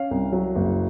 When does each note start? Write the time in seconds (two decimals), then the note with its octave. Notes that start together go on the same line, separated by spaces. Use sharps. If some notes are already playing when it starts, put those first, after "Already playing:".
Already playing: C#4 F5
0.11 C2
0.32 F#3
0.55 F#1